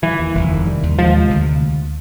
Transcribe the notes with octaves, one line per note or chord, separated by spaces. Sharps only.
E3 G3
D#2
F1
D#3
G3
D#2
F3 G#3
C3
D2